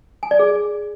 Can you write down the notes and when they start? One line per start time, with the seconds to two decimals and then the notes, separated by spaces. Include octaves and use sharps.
0.23 G#5
0.31 D5
0.39 G#4